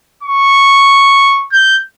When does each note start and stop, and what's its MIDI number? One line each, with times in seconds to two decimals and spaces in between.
0.23 1.45 85
1.52 1.80 91